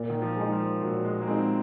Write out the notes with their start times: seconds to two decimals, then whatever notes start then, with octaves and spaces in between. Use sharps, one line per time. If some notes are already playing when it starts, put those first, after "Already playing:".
Already playing: A#2
0.10 D#3
0.22 F3
0.36 G#3 D#4
0.52 F3
0.82 A#2 F#3
1.05 G#3
1.22 A#3
1.27 G#3 C4 D#4